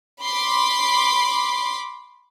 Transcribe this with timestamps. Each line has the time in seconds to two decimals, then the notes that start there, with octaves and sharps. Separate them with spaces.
0.22 B5 C6 D6